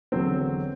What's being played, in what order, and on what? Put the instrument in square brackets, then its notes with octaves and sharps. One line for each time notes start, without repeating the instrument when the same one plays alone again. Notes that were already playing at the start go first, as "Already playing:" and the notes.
[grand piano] E1 E2 D3 F#3 C4 C5